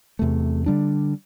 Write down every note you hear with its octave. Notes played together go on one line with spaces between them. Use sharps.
E2 C3 A3
D3 G3 D4